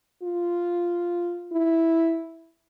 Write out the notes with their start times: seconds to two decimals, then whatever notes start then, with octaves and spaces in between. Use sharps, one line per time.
0.23 F4
1.52 E4